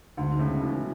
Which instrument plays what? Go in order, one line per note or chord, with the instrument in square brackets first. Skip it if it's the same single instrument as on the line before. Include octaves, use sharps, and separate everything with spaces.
[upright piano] D2 [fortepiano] G#2
[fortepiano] G#2
[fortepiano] A2 [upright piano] C#3
[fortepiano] B2 [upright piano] E3